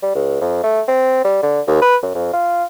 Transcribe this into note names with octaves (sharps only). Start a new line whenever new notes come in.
G3
C#2
F2
A3
C4
G3
D3
D#2
B4
F#2
F2
F4